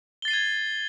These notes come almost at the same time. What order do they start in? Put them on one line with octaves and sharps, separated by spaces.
G7 A6 C7 D#7 G#6